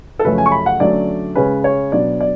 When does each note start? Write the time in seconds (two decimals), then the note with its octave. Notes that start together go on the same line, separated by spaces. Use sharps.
0.19 A4
0.25 F#2 C#3 F3 A3 C#4 B4
0.38 G#5
0.46 C#6
0.52 B5
0.66 F#5
0.80 D3 F#3 A3 C#4 D5
1.35 C#3 G#3 C#4 B4
1.64 C#5
1.92 B2 F#3 B3 D4 D5
2.20 D5